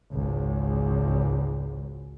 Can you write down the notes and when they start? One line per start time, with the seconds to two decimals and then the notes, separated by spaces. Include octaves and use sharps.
0.12 G#1 C#2